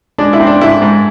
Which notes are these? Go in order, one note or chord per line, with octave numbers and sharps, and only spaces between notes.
G#3 D4
E4
C4
D4
G#2 E4
G#2